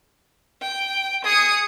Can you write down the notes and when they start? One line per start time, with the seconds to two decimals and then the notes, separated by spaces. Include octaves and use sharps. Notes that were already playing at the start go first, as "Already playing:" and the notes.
0.62 G5
1.25 G#4 D#6 C#7